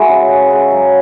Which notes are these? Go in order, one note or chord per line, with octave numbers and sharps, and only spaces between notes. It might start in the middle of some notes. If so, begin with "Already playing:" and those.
Already playing: G#3 E4 F#4
C#3
G#3
C#3
F#3